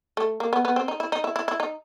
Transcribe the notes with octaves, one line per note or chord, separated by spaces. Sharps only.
A3
A#3
B3
B3
C4
D#4
E4
D#4
E4
E4
E4
D#4